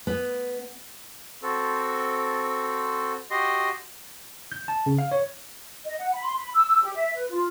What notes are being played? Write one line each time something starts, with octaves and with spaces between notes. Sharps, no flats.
B3
C4 F#4 A4
F#4 G4 D#5 C6
G6
A5
C#3
F5
C#5
D#5
F#5
B5
C6
B5
E6
E6
G4
E5
B4
F4